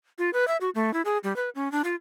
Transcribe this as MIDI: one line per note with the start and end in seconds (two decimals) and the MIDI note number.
0.18 0.30 65
0.33 0.47 71
0.48 0.57 76
0.61 0.70 66
0.75 0.93 57
0.94 1.02 64
1.05 1.18 68
1.24 1.35 55
1.36 1.49 71
1.55 1.71 61
1.72 1.82 62
1.84 1.95 65